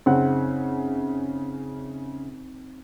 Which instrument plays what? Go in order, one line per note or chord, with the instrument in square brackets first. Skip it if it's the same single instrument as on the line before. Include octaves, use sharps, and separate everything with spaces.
[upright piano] F#2 C#3 F#5 [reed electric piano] C4 D#4